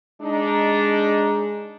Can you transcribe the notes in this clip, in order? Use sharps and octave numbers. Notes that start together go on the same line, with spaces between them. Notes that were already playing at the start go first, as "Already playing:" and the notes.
G#3 D4 D#4